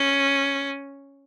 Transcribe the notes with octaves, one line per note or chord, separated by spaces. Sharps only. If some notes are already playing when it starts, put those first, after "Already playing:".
Already playing: C#4